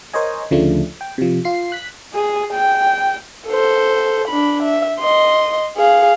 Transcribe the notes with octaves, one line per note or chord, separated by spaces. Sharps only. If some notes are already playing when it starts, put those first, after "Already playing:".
A#4 C5 C#5 D#5 G#5
D2 C#3 F3 A3 D4
G5
C3 F3
F4 C7
F#6 B6
G#4
G5
A4 C5
D4 B5
E5
D#5 C6
G#4 F5